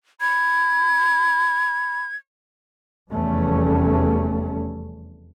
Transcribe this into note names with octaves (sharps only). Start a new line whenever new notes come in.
B5 G#6
F1 E2 G3 A3 C#4